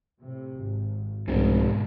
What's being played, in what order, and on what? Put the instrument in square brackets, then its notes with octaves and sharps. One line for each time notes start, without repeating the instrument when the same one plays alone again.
[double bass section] A2 C3
G#1
[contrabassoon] F1 [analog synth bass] C2 [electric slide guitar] G#2 B2 [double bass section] D3 G#3